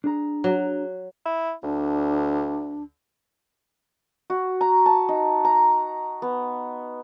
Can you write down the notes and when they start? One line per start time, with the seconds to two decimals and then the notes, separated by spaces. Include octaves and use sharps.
0.04 D4 G#4 A#5
0.44 F#3
1.26 E4
1.63 D2 D4
4.30 F#4
4.61 A#5
4.86 A5
5.08 D#4
5.45 A#5
6.22 B3